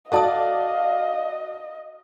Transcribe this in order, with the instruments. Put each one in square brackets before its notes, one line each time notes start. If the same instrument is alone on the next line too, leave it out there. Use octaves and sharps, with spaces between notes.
[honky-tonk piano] F#4 D5 [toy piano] A4 A5 D#6 [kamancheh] D#5 [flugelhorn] F5